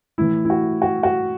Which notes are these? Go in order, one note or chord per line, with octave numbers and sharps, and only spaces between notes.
A2 E3 E4
E4
F#4
F#4
F#4